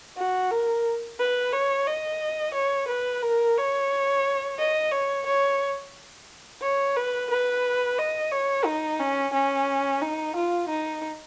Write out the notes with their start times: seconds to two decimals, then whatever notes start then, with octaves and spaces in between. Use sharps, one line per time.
0.17 F#4
0.51 A#4
1.19 B4
1.52 C#5
1.87 D#5
2.54 C#5
2.88 B4
3.22 A#4
3.57 C#5
4.59 D#5
4.92 C#5
5.26 C#5
6.62 C#5
6.96 B4
7.30 B4
7.98 D#5
8.32 C#5
8.65 D#4
9.00 C#4
9.33 C#4
10.02 D#4
10.35 F4
10.69 D#4